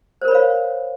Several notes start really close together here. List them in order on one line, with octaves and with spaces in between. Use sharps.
C5 A#4 B5 C#5 F5